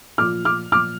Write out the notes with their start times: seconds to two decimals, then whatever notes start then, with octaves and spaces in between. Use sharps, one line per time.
0.18 A#2 F3 D6 F6
0.45 D6 F6
0.72 A#2 D6 F6
0.75 F3